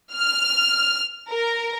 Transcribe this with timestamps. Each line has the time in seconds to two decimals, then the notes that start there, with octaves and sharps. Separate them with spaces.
0.13 F6
1.31 A#4